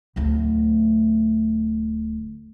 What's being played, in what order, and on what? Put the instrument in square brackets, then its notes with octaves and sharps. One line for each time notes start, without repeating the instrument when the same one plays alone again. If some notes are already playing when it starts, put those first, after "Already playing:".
[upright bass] D1 D2